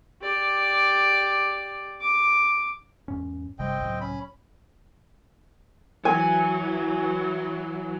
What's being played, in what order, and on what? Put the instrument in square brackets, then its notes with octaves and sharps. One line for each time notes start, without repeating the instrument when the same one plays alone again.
[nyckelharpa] G4 D5
D6
[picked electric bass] E2 G#2 C#4
[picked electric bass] G1 C3 G3 [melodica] C4 D#5 G5
[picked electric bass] C#2 A2 F#3
[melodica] C#4 B5
[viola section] E3 F#3 [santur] G#5